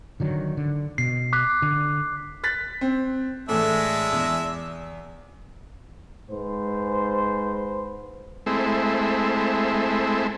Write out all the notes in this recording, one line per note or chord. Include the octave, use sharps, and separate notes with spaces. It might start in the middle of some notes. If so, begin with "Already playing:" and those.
D3 D#3 F#3
D3
B2 C7
D6 F#6 B6
D3
F#6 A6 B6
C4
A2 E3 G#3 D4 E5
E2
G#2 B4 C5
G#3 A3 C4 E4